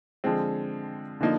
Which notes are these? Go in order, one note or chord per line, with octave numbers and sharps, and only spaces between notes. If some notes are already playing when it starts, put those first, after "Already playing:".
D3 F3 G#3 C4
D3 F3 A#3 D#4